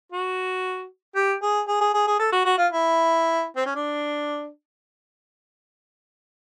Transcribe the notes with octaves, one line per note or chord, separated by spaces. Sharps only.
F#4
G4
G#4
G#4
G#4
G#4
G#4
A4
F#4
F#4
F4
E4
C4
C#4
D4